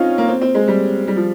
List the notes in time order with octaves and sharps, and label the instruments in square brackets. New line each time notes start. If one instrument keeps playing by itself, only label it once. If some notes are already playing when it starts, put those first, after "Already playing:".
Already playing: [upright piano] C4 C#4 D#4 F4
A#3
C4
C4
G#3
G3
G3
F3